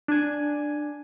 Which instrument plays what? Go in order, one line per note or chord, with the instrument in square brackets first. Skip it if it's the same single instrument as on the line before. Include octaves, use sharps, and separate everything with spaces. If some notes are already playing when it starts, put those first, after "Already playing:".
[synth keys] D4 G#5